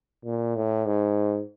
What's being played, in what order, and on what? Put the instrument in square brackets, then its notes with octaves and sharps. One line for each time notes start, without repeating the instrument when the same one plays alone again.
[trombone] A#2
A2
G#2